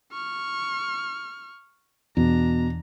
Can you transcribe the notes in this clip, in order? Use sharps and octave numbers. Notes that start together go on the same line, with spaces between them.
C#6 F6
E2 B2 D4 A#5